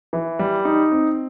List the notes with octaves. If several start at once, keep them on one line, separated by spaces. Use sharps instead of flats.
E3
G3
D#4
C4